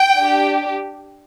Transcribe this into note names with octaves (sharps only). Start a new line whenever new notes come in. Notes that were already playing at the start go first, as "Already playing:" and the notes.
Already playing: G5
D4 G4